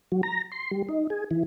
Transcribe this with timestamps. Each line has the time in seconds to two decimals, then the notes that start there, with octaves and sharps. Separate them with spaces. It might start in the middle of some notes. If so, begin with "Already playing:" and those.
0.12 F#3
0.23 A#5
0.52 C6
0.71 G3
0.89 D#4
1.10 G#4
1.31 E3